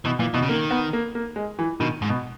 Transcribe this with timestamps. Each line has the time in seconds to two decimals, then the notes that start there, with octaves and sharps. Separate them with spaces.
0.05 B2 E3
0.19 A#2 E3
0.34 B2 E3
0.42 C#3
0.49 D#3 A#3
0.70 B3
0.93 A#3
1.15 A#3
1.36 G#3
1.59 E3
1.80 B2 D#3
2.02 G#2
2.09 B2